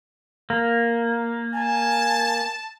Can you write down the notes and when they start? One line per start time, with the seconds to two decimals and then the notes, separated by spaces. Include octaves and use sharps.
0.50 A#3
1.53 G#5 A5